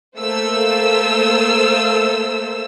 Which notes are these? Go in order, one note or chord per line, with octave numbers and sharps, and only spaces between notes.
A3 A#3 C5 E6